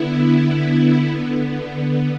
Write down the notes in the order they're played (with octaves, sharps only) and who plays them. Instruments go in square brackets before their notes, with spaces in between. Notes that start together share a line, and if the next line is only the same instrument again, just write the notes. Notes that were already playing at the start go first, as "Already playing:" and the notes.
Already playing: [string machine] D3 B3 E4